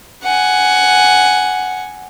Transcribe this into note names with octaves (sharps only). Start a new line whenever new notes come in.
F#5 G#5